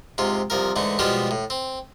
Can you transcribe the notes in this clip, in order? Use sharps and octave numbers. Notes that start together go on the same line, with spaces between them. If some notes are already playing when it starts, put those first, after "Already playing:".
G#2 C3 F4
C2 F3 A#4
G#2 D3 E3 A3
B2 F3 G3 G#3 F4 G4
A2
C4